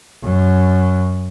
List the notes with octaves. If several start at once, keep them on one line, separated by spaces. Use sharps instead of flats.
F#2